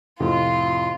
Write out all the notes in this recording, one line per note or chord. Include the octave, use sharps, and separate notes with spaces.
F2 A2 C3 F4